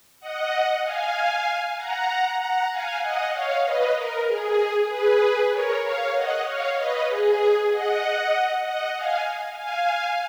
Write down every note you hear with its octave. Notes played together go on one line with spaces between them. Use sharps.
D#5 F#5
F5 G#5
F#5 A#5
F#5 A#5
F5 G#5
D#5 F#5
C#5 F5
B4 D#5
A#4
G#4
G#4 B4
A#4 C#5
C#5 F5
D#5 F#5
C#5 F5
B4 D#5
G#4
D#5 F#5
D#5 F#5
F5 G#5
F5 G#5